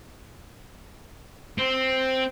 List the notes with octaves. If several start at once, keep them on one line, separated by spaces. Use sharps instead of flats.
C4